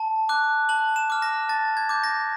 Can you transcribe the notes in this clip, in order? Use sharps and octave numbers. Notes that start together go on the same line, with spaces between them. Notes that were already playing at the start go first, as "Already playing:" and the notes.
Already playing: A5
D6 F#6
A5 F#7
E7
D6 F6
A#6
A5 A6
G#6
D6 G6
A#6